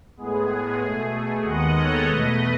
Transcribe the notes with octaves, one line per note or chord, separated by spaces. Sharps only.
A2 G#3 B3 G#4
B2 A3
D#2 D#3 G#3 B3 D#5 F#5
A4 C#5
E2 B2 A3 B4 D#5